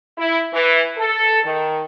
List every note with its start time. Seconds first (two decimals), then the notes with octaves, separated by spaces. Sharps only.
0.18 E4
0.54 E3
0.98 A4
1.44 D#3